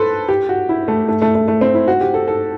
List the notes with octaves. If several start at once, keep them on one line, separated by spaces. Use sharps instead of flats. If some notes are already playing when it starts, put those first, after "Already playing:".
Already playing: A4 B4 C5
G4
F#4
E4
A3
A3
A3
A3
A3
C4
E4
F#4
G4
A4
A4